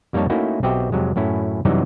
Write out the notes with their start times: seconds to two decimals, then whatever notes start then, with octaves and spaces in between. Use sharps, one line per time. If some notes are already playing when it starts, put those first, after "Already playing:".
0.13 F2 G3 A#3 D#4 C#5 A5
0.30 A3 A#3 C#4 D#4 E4 F#4
0.63 B1 C4 F#4 G4 D#5 E5
0.92 F2 C3 F#3 G#3
1.16 F#2 A2 C#4 E4
1.65 F#2 C3 E3 F#3 G3 D#4